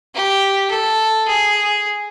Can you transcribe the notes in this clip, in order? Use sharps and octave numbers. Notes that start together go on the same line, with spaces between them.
G4
A4
G#4